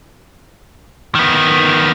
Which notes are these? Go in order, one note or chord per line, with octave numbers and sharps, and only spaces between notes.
D#3 B3